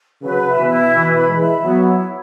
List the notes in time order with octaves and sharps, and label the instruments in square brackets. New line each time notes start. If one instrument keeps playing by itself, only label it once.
[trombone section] C#3 F#3 [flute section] B4
[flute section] E5
[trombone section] B2 E3
[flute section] E4
[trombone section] B2 E3 [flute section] B4
[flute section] B5
[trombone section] E3 G#3
[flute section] E5
[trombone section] F#3 B3 [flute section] C#5
[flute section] E4